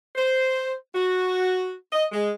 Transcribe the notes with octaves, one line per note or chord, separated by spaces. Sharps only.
C5
F#4
D#5
G#3